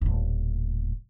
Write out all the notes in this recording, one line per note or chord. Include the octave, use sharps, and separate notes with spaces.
D#1 A2